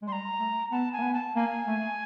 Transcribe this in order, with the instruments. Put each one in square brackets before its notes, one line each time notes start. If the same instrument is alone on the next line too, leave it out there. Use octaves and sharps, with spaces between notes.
[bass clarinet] G#3
[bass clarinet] G3 [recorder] C6
[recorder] A#5
[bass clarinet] A3
[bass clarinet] B3 [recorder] A5
[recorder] G#5
[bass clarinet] A#3
B3
[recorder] A5
[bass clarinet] A#3 [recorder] G#5
[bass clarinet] A3